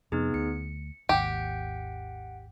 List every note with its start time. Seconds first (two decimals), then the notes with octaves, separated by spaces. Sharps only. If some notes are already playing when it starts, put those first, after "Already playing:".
0.12 F2 C3 B3 D#4 G#4
0.34 D2 C#7
1.09 G#1 D#2 G4 F#5 D7